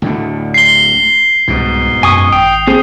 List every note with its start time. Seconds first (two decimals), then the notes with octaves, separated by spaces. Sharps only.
0.02 D2 A2 D3
0.54 C7 G7
1.48 C2 G#2 B2
2.03 F#2 G#5 C#6 D#6
2.32 G#1 G5 D#6
2.67 C4 G#4 C5